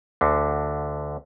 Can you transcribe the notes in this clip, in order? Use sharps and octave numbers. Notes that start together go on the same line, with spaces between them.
D2 D3